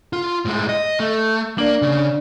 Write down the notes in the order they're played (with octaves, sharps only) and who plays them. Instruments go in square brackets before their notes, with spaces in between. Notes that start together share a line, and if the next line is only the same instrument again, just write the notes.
[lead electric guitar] F4
A2 G#3
D#5
A3
[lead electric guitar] A#3 [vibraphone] D4 D5
[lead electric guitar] C#3